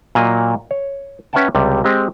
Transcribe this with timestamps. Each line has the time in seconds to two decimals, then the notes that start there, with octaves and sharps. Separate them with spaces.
0.15 A#2 F#3 A#3 D#5
0.71 C#5
1.33 C#4 B4 E5 F#5 G5 A5
1.55 C#2 C3 G3
1.84 G#3 C4 G4 D#5